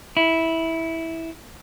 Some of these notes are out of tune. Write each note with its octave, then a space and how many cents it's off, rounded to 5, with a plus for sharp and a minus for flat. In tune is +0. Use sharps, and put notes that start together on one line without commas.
E4 -10